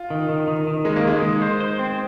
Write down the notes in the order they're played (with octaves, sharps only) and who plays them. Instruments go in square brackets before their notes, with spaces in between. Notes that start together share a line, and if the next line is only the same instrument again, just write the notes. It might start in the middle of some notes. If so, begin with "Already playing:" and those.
Already playing: [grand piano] F4
[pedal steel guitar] D#3
D#3
D#3
D#3
[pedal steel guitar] D#3 [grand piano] G#3
[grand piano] A#3
[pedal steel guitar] D#3 [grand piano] G#3
[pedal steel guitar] D#3
C5
C5
C4